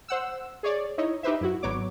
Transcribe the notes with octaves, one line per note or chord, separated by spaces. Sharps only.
C5 F#5 E6
G#4 C#5 D5
D#4 E4 C#5 D#5
D#4 G4 B4 C5 E5
F#2 E4 F#4
G#1 F#3 B3 C#5 D6